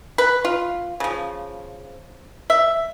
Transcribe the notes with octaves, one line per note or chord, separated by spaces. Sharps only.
B4
F4
C#3 F3
E5